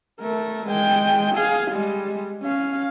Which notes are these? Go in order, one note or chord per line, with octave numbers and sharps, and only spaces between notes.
A3 A#4
G#3 G5
G#4 F5
G3 G#3
C#4 F5